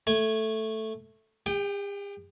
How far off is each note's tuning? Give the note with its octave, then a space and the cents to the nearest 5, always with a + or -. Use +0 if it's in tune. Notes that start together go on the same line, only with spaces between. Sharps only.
A3 +0 G#5 +0
G4 +45 G5 +0